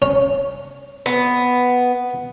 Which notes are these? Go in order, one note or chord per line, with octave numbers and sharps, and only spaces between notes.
C#4
B3